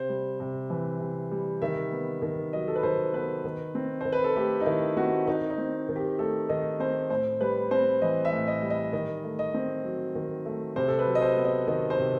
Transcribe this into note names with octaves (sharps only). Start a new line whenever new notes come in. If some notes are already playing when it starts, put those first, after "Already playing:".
Already playing: C3 C5
G3
C3
E3
C3
G3
D#3 E5
B3
D#3
F#3 D#5
A4
B4
D#3 C5
B3 B4
D#3
C4
D#3 C5
B4
A4
A3 G4
D#4
D#3 E4
C4 F#4
D#3 D#4
D#4
C4
D#3
G4
A3 A4
D#3 D#5
C4 C5
A2 C5
G3 B4
C4 C5
E3 D#5
E5
A2
D#5
G3
D#5
D#3 D#5
A3
D#5
C4
F#3
D#3
A3
C3 C5
A4
B4
F#3
D#5
C5
B3
D#5
D#3 D#5
C5
C3